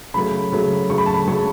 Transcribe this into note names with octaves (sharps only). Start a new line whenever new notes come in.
C#3 F#3 A3 B5
C#3 F#3 A3
C#3 F#3 A3 C#6
B5
A5
B5
C#3 F#3 A3 C#6